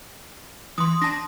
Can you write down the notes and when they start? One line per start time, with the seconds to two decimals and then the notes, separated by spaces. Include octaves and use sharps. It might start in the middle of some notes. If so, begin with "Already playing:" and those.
0.78 E3 C6 D#6
1.02 D4 A5 A#6